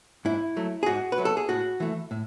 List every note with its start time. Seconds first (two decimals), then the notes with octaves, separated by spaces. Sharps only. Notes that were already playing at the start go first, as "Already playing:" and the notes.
0.25 G#2 E4
0.57 F#3 A3
0.83 G#4
0.86 G#2 F#4
1.12 B4
1.18 F#3 A3
1.25 A4
1.37 G#4
1.49 A2 F#4
1.80 E3 A3
2.11 A2